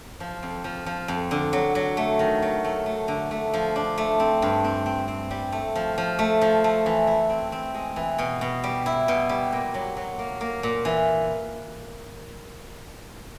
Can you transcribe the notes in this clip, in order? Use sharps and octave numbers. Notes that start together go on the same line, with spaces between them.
F3
F2
F3
F3
F2
D3
F#3
F#3
A3
D#3
F#3
A3
A3
D3
A3
F3
D4
A3
C4
G2
C4
C4
C4
G3
A3
F3
F3
A3
F3
A3
E3
E4
C4
C4
G#3
E3
B2
B2
G3
E4
B2
G3
A#2
F#3
F#3
A#3
A#3
A#2
E3